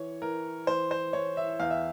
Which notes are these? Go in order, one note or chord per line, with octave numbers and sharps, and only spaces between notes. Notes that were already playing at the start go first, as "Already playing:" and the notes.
Already playing: E3 C#5
E3 A#4
E3 C5
C5
E3 C#5
E5
E2 F5
E5